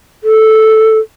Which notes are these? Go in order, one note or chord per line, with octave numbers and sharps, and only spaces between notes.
A4